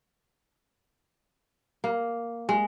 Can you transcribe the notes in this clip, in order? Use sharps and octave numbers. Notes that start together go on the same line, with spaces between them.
A#3
G#3